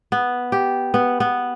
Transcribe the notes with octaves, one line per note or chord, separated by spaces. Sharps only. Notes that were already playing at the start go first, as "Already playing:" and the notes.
B3
G4
B3
B3